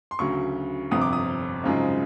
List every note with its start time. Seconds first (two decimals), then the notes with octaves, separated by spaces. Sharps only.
0.11 C6
0.19 D2 C#3 F#3 C#6
0.91 G1 F2 C3 D#6
1.01 D6
1.13 D#6
1.64 G#1 F#2 C#3 F3 G#3